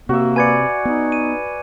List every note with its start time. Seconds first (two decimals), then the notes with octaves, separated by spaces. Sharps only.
0.09 C3 A#3 F#4 E5
0.36 B4 D5 G#5 G#6 C#7
0.85 B3 D#4
1.12 D#7